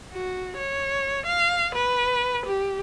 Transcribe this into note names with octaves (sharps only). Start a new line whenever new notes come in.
F#4
C#5
F5
B4
G4